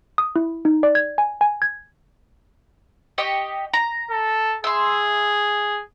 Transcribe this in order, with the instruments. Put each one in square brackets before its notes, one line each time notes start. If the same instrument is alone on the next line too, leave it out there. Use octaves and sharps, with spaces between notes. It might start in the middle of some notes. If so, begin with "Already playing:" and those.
[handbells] D#6
E4
D#4
D5
G#6
G#5
G#5
G#6
[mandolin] G4 D#5 C#6
A#5
[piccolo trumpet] A4
[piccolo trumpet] G#4 [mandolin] E5 C6